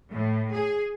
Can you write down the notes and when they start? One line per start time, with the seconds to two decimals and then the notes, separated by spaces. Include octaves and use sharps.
0.12 A2
0.55 G#4